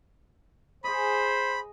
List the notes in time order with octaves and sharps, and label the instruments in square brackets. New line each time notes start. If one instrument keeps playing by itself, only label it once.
[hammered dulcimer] G#4 D#5 [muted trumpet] C5 [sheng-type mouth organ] B5